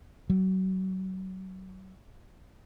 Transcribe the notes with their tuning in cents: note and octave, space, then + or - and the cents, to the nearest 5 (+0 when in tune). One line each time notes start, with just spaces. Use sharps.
F#3 +25